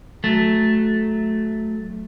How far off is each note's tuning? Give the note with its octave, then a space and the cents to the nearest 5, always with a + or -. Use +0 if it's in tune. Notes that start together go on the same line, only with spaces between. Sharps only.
F#3 +0 A3 -10